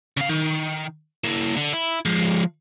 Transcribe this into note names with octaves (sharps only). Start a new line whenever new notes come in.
C#3 F5
D#3
A#3 E4
D3
E4
F3 G#3